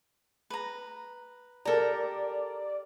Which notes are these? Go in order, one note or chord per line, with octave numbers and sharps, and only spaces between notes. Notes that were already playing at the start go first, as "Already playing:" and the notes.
B4 A#5
G4 A4 A#4 D5 A#5